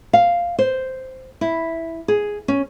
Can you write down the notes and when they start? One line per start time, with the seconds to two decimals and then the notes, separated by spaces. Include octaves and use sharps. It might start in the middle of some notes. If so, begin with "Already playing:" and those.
0.13 F5
0.59 C5
1.41 E4
2.08 G#4
2.48 C#4